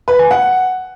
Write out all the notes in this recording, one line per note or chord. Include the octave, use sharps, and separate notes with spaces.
B4
G#5
F#5